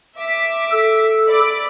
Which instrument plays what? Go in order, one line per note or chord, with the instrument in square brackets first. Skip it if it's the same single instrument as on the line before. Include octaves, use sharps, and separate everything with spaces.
[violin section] E5 D6 B6
[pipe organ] A4
[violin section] D5 B5 D6